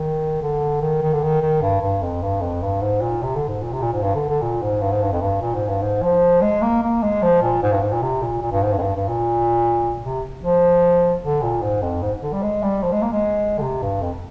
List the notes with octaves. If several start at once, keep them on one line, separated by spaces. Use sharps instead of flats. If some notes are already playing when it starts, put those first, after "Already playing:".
Already playing: D#3
D3
D#3
D#3
D3
D#3
D#3
G2
G2
F2
G2
F2
G2
G#2
A#2
C3
D3
G#2
A#2
C3
A#2
G#2
G2
D3
D3
A#2
G#2
G2
G#2
G2
F2
G2
A#2
G#2
G2
G#2
F3
G#3
A#3
A#3
G#3
F3
A#2
G#2
G2
G#2
A#2
C3
A#2
A#2
G2
G#2
G2
F2
G2
G2
A#2
C3
F3
D3
A#2
G#2
F2
G#2
D3
G3
G#3
G3
F3
G#3
A#3
G#3
D3
C3
G2
F2